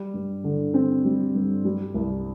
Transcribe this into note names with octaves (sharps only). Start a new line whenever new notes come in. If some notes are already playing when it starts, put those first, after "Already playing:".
Already playing: G3
G2
D3
C4
G3
G2
G3
C2